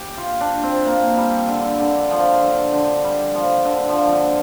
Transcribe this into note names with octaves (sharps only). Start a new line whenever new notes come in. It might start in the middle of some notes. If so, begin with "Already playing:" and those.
Already playing: G4
F4
D4
C4
A#3
G3
D3
D3
F3
D3
D3
G3
F3
D3
F3
F3
D3